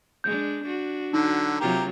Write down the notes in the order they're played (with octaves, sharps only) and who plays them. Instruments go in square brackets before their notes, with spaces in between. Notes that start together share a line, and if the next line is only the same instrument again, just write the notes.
[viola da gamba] G#3 D4 [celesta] G6
[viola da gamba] D4 F#4
[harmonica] D3 F#3 [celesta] D#4
[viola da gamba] C3 F#3 F4 [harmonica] A#3 G4 A#4